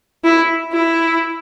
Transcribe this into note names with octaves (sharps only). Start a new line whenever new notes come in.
E4
E4